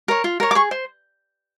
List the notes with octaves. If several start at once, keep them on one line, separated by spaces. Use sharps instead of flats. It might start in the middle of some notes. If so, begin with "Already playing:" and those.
A#4 C#5
F4
A#4 C#5
D6
G#4 C#6
C5